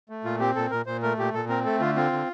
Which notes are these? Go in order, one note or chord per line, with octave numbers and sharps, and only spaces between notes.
A3
A#2 F4
C4 G4
A#2 A4
A#2 A#4
A#2 C5
A3 A#4
A#2 G4
A#2 A4
C4 A#4
A3 A4
D3 F4
C4 F4
D3